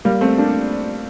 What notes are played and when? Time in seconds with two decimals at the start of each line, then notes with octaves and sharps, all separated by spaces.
0.05 G3 A#3
0.21 A3 C4
0.38 A#3 D4